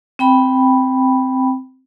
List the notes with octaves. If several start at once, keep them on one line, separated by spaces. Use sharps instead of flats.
C4 G5 B5